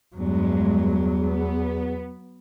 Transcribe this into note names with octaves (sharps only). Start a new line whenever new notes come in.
E2 G2 F#3 G#3
B3